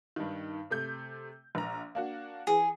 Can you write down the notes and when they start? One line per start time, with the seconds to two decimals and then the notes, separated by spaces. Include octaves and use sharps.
0.16 G2 D#3
0.70 C3 A3 G6
1.55 A#1 A#5
1.95 A#3 D4 F#4
2.47 E3 G#4